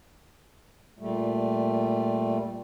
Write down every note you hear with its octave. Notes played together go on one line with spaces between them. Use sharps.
A#2 G3 A3